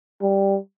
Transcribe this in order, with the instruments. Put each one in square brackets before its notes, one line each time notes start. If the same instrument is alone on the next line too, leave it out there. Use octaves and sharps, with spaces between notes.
[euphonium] G3